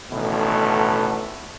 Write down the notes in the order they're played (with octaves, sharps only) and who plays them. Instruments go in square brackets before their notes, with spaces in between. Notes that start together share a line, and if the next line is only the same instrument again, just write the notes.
[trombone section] A1 B2 D3 D#3 A3